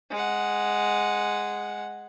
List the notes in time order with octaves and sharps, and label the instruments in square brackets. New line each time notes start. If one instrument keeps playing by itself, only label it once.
[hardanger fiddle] G#3 F#5